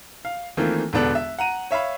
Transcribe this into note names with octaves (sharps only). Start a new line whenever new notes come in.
F5
D#3 E3 A3 A#3 C4 F4
E1 D3 B3 D4 A4 F#6
E5
F#5 A#5 D#7
C#5 E5 F5 B5